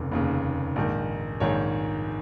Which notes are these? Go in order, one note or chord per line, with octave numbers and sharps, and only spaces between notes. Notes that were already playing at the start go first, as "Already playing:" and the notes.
Already playing: F1 D#2 C#3
F1 D#2 C#3
A#1 G#2 D#3
A#1 G#2 D#3 C#5